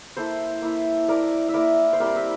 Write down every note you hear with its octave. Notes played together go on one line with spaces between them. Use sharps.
A#3 E4 A4 C5
A#3 E4
A#3 E4 A#4 D5
E5
A#3 E4 A#4 D5
C5
G3 C4 E4 A#4 D5
C5 E5